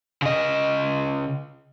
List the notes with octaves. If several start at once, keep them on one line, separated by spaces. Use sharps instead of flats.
C#3 D#5